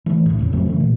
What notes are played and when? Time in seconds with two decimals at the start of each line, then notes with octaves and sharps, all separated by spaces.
0.06 E3 A3
0.26 C#2 A2
0.39 G#1 E2 C#3
0.52 F2 F#3 A3 C4
0.66 C#3 E3 A3
0.80 A#2